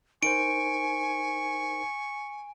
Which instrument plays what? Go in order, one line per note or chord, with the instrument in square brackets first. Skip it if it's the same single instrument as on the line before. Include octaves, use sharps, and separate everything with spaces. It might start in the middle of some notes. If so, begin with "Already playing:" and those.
[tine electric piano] D#4 A#4 C5 [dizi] G#5 [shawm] C#6 [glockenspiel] D7